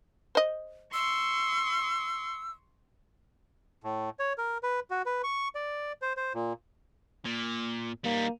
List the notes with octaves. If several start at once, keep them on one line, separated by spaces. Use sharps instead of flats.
C5 D#5
C6 C#6 E6
A2
C#5
A#4
B4
F#4
B4
C#6
D5
C5
C5
A#2
A#2
G3 A#3 D#4